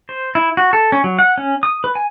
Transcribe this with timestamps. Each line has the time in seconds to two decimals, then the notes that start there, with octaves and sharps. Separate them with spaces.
0.09 C5
0.35 E4
0.57 F#4
0.73 A4
0.92 C#4
1.04 F#3
1.19 F#5
1.38 C#4
1.63 D#6
1.84 B4
1.95 G#5